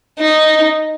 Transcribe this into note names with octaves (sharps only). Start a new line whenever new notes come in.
D#4